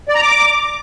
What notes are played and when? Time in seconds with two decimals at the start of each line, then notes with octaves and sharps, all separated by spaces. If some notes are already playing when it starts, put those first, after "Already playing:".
0.08 D5
0.15 A#5
0.22 D6